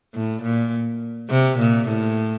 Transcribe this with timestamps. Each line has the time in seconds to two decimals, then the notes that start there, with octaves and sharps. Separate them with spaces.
0.14 A2
0.43 A#2
1.30 C3
1.59 A#2
1.88 A2